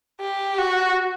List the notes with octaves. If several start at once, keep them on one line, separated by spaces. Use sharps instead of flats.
G4
F#4